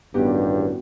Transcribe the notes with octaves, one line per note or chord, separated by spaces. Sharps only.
A1 G2 D#3 B3 F#4 G4